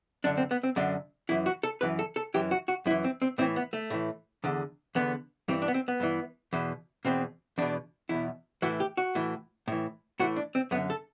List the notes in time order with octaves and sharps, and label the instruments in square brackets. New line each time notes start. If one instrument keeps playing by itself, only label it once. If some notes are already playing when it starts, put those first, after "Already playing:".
[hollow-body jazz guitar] F#2 D3 D4
C4
B3
C4
F#2 D3 D4
F#2 E3 E4
F#4
A4
F#2 E3 B4
A4
A4
F#2 E3 G4
F#4
F#4
F#2 E4
E3
C4
C4
A2 E3 C4
B3
A3
A2 E3
E2 D3
E2 D3 B3
G2 E3 C4
D4
B3
C4
B3
G2 E3
E2 B2
E2 B2 C4
E2 B2 D4
E2 B2 E4
A2 E3 F#4
G4
F#4
A2 E3
A2 E3
A2 E3 F#4
D4
C4
F#2 B3
D3
A4